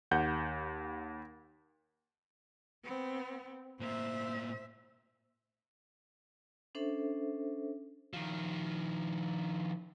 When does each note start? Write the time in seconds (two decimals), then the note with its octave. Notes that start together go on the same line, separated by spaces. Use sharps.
0.11 D#2 F#5 G6
2.84 B3 C4
3.80 A2 A#3 C5 E5
6.75 C#4 D4 A4 C5 E5
8.13 D#3 F3